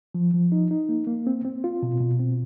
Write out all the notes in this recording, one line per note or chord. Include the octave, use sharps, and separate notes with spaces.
F3
F3
D#4
D#4
A#3
A#3
C4
C4
F4
B2
B2
C4